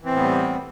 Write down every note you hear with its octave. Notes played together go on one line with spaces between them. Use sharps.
A2 E3 G3 B3 C4